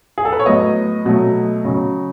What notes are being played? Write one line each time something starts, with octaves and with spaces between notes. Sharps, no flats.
G#4
A4
B4
C#5
A2 F#3 B3 D#5
B2 F#3 A3
C#3 F#3 C#4